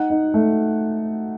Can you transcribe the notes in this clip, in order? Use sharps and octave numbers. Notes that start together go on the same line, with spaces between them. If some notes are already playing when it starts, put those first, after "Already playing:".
Already playing: D#4 F#5
D#4
A3